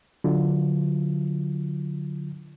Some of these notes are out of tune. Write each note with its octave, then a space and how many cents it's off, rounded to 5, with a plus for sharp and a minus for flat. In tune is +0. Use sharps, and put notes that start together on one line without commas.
D3 -10 F#3 -25 F4 -25